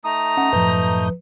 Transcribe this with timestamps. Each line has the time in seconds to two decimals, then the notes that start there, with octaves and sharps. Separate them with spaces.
0.04 A3 D#4 A#5 D#6
0.37 C#4 F#5
0.53 F#2 A2 F3 B4 G6